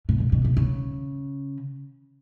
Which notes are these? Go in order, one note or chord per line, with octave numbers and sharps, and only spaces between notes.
B2
A#2
B2
C3
C#3